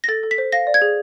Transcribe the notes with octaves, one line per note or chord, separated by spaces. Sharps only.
A#6
A4 A6
A4
B6
C5
F5 A#6
D5
G#6
G#4